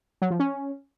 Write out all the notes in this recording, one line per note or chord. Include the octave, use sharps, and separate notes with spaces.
F#3
F3
C#4